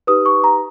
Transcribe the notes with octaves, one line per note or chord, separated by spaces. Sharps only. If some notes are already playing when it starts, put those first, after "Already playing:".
D#4 G4 B4 D#6
C#6
A#5